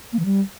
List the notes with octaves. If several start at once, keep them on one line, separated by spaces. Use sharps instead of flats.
A#3
E3
G3